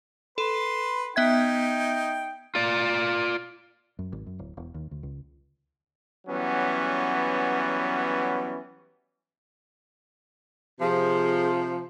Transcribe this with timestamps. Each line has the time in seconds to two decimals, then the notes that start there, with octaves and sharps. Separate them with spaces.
0.38 A4 B4 C6
1.16 B3 D#4 E5 G5 G#6
2.55 F4 D5
3.99 F#2
4.12 G#1
4.26 F#2
4.39 D1
4.57 E1
4.74 D#2
4.91 D2
5.03 C#2
6.26 E3 F#3 G3 B3 C#4
10.81 C3 F3 G#4